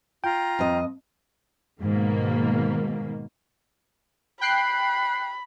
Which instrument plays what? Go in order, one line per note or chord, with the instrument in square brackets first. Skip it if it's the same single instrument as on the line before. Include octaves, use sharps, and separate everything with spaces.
[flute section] F4 A#5 [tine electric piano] G5
[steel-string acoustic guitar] F2 D#5
[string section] G#2 B2 D#3 A#3
[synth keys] G5 F#6 C7 [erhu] B5